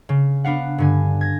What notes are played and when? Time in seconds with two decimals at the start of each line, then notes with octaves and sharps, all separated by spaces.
0.09 C#3
0.44 B3 D4 F5 F#5
0.78 G2 D3 G#5
1.21 G#6 A#6